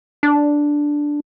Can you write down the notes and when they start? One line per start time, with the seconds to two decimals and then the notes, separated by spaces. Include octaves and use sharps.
0.23 D4